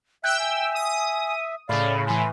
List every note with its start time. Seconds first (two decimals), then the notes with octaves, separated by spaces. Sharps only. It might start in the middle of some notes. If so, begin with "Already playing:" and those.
0.24 E5 G5 E6 F#6
0.39 G#5
0.75 D#6
1.69 A2 C#3 D5 F5 B5
2.07 A2 E3 G#5 B5 C6